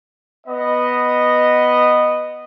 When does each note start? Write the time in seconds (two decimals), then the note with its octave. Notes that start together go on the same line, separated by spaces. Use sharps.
0.47 B3 D#5